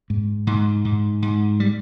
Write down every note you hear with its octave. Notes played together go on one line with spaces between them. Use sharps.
G#2
G#2
G#2
G#2
G3